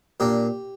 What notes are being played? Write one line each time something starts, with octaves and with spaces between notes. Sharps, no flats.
A#2 A#3 D4 G4